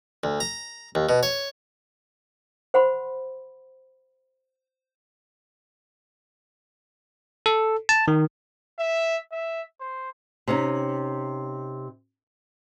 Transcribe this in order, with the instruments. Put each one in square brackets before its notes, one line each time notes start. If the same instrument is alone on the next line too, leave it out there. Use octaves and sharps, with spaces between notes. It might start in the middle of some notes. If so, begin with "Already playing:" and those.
[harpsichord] D2
A#5
D#2
B2
C#5
[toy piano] C5 F#5 B5 C6
[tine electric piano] A4
A5
D#3
[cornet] E5
E5
C5
[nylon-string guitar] C3 C#4 D#4